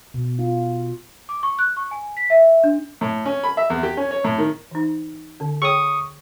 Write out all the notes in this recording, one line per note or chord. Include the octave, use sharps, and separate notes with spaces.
B2
F4
D6
C#6
F#6
C#6
G#5
B6
E5
D4
A2
C#4
B5
E5
E2
G4
C#4
C#5
A2
D#3
E3 D#4
D3 C#4
G#4 C#5 G5 C#6 D#6